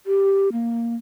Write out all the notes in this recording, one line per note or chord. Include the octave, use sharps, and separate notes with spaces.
G4
A#3